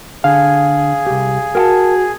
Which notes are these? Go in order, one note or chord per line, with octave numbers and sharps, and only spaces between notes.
D3 G#4 F5
C2 G4
F#4 A#4 G5 A5